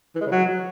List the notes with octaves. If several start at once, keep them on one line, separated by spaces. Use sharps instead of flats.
E3
G#3
C#3
F#3